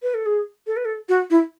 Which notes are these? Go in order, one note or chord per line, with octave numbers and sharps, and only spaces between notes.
B4
A4
G#4
A4
B4
A4
F#4
E4